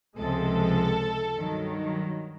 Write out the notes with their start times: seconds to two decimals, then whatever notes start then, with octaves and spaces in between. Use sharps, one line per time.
0.17 C#2 C3 F3 G#3 A4
1.39 G2 D#3 F#3